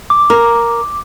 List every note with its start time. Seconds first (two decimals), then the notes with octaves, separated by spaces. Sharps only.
0.10 D6
0.30 A#4